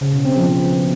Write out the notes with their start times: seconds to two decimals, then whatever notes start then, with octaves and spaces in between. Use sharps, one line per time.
0.01 C#3
0.13 B2
0.25 C4
0.37 F3
0.49 B2